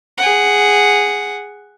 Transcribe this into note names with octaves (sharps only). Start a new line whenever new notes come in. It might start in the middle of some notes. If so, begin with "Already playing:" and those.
G#4 F#5